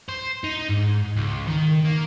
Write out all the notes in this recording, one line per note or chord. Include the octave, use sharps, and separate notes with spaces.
C5
D#4
G#2
C#2
D#3
A#3